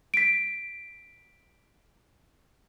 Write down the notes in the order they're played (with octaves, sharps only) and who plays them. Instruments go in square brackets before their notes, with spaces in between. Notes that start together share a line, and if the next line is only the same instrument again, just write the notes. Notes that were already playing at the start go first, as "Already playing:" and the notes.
[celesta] B6 D7